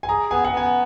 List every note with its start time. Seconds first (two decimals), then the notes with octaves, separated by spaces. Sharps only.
0.03 G#5
0.09 G#4 A#5
0.31 B3 G#5
0.44 F#5
0.52 B3 G#5